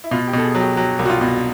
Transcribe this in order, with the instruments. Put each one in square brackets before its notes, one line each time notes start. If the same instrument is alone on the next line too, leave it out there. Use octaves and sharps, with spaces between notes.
[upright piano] E4
[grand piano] B2 [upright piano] F4
[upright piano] G4
[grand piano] B2 [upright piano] A4
[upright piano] G#4
[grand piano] F#3
[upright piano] G4
[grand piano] F#3 [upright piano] G4
[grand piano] C2
[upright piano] F#4
F4
[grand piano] B2